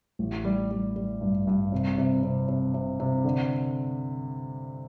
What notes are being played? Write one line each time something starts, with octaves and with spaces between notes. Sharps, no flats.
A1
G3
G3
G3
G2
G2
C3
C3
C3
C3
C3
C3
D3